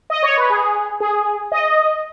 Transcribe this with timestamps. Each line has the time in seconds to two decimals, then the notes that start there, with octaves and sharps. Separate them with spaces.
0.10 D#5
0.23 C#5
0.37 B4
0.50 G#4
1.00 G#4
1.52 D#5